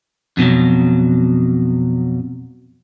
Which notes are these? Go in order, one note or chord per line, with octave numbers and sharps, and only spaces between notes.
F2 B2 E3 F#3